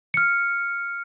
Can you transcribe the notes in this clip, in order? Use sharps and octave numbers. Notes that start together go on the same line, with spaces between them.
F6 C#7